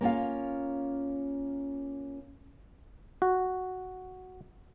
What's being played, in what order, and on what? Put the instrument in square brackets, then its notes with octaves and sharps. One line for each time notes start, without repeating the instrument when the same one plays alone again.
[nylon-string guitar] A#3 C#4 F4 F5
[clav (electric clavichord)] F#4